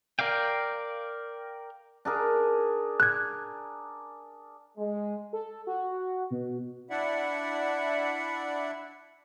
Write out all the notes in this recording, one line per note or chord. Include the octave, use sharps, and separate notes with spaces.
A#4 D5 F5 G5
D4 G#4 A#4
F#6 G#6
G#3
A4
F#4
B2
D4 E4 D5 E5 F#5